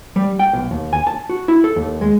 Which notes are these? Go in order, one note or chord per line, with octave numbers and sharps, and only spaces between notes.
G3
G5
B1
D#2
G#5
A5
F#4
E4
A4
D#2
G#3